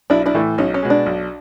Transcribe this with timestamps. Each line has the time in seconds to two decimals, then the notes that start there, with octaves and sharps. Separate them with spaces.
0.10 B1 D4 E4
0.26 D4 E4
0.34 A2 E3 A3
0.58 B1 C#4 D#4
0.74 C#4
0.82 B2 G#3
0.90 D4
1.06 B1